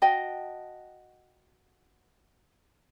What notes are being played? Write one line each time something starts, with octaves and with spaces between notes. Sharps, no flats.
F#4 D#5 G5 A5